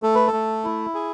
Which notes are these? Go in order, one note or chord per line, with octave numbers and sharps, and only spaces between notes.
A3 A4
B4
A4
A3
E4
G#4